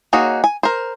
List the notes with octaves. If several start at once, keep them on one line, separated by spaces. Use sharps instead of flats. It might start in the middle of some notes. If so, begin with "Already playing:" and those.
A#3 D#4 F#4 G#4 C#5
G#5
A#4 C5